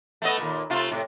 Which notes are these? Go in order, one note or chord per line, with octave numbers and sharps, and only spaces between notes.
A3 B3 D#5
D#2 A#2
C3 A3 F4
A2 C3